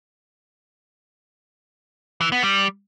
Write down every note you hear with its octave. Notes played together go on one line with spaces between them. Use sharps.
E3
B3
G3